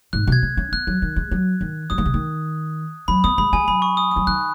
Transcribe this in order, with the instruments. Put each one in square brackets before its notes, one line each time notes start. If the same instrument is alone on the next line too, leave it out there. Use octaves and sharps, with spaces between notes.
[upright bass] G#2 [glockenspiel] F#6
[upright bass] B2 [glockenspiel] G#6
[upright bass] G#3
C#4
[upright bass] B3 [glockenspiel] F#6
[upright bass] F#3
D#3
G#3
F#3
D#3
[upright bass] F#3 [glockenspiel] D#6
[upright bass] D#3
C#3
D#3
[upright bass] F#3 [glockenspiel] B5
[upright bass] B3 [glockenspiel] D#6
[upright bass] G#3 [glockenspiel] B5
[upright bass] G#3 [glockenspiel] G#5
[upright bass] F#3 [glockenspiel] B5
[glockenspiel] C#6
D#6
[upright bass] F#3 [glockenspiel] D#6
[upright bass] D#3 [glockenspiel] F#6